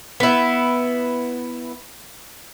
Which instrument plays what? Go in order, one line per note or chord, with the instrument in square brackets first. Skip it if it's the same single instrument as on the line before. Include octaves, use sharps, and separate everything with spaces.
[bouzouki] B3 E4